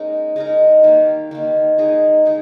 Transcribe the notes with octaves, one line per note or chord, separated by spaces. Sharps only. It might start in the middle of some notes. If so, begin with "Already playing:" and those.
Already playing: G#3 A#3 C#4 D#4 A#4
G#3 D#4 A#4
D#3 G3 A#3
D#3 G3 A#3
G#3 D#4 G#4
G#3 D#4 G#4